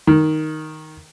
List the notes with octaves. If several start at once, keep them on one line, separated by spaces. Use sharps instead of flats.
D#3